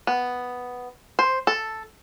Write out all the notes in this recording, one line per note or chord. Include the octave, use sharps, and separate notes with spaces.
B3
C5
A4